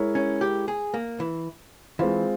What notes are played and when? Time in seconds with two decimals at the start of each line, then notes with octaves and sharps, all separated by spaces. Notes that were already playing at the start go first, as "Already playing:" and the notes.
Already playing: G#3 E4 A#4 C#5
0.15 C#4
0.41 G4
0.68 G#4
0.94 A#3
1.20 E3
1.99 E3 G#3 C4 F4